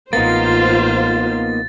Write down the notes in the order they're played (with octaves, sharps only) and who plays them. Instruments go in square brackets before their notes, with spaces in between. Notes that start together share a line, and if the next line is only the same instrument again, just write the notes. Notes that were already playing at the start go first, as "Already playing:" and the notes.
[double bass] A1 [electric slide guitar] A#3 B3 D#4 [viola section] F4 C5 [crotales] A6